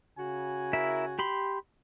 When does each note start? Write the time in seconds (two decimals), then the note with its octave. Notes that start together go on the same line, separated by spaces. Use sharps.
0.18 C#3 F#4 G#5
0.73 E4 A#4 E5
1.19 G4 B5 C6